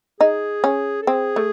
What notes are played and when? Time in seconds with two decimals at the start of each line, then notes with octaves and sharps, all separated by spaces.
0.20 D#4 G#4
0.64 C#4
1.02 A4
1.07 C4 G#4
1.36 A3